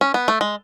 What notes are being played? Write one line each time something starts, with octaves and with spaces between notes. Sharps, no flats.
C#4
B3
A3
G#3